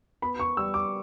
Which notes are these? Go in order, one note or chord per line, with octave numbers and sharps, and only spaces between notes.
B3 B5
C#6
G3 E6
D6